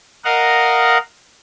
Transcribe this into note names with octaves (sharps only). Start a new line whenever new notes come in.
A#4 D#5 F5 F#5